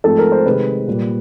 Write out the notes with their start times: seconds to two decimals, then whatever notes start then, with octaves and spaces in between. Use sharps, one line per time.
0.04 G#2 F3 A3 C4 A4
0.18 A#4
0.32 C5
0.46 C3 D#3 G#3 B4
0.87 A#2 G3 A#3